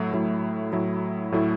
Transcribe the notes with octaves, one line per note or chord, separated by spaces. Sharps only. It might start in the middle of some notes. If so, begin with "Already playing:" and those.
Already playing: A2 F#3 A3 E4
A2 F#3 A3 E4
A2 F#3 A3 E4
A2 F#3 A3 E4